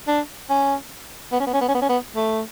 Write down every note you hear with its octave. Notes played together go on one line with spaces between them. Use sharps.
D4
C#4
B3
C#4
B3
C#4
B3
C#4
B3
C#4
B3
A3